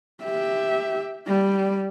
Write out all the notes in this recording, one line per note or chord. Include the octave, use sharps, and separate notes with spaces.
G4 E5
G3